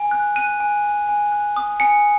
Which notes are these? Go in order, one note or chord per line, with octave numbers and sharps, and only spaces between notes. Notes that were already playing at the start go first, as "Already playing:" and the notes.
Already playing: G#5
F#6
F#6 D#7
G#5
G#5
G#5
F#6
D#6
G#5 C#7